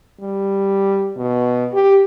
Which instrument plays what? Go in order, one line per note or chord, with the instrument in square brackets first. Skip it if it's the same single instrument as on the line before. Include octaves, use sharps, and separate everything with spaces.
[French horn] G3
B2
G4